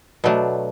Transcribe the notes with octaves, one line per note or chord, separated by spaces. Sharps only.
B2 F#3 A3 D4